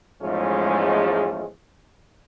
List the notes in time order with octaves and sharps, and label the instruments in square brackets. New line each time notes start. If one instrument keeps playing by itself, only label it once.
[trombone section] E2 G#2 F3 G#3 A3 C#4